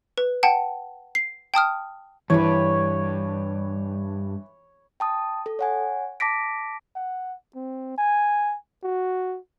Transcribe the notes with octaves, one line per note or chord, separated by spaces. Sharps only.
B4
F#5 G5 A5
C7
G5 A5 D#6 F6
G2 E3 C#5 B5
G5 A5 D#6
A4
C#5 F#5 G#5
A5 D6 A#6 B6 D7
F#5
C4
G#5
F#4